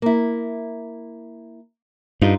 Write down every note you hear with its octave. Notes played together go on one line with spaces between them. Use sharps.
A#3 E4
G2 D#4 F4